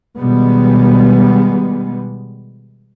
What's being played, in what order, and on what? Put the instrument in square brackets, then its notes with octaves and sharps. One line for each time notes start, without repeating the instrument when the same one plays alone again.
[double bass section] B2 D#3 G3 G#3 B3